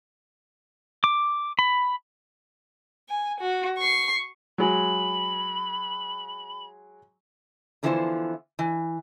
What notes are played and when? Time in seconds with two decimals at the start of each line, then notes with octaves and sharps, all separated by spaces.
1.04 D6
1.59 B5
3.09 G#5
3.40 F#4
3.78 C#6 C7
4.58 F#3 G#3 B5
7.83 D3 E3 F3 B3 E4 C5
8.59 E3